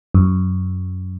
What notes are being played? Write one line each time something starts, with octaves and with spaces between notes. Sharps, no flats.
F#2